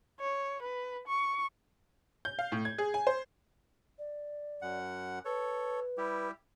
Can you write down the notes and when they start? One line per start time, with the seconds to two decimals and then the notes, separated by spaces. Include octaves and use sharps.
0.20 C#5
0.63 B4
1.08 C#6
2.25 G6
2.39 F5
2.52 A2
2.65 G#6
2.78 G#4
2.94 G#5
3.07 C5
3.98 D5
4.62 F#2 F#5
5.25 A4 B4 C#5
5.98 G3 E4 G4